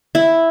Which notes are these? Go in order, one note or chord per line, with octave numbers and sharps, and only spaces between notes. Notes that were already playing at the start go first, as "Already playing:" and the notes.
E4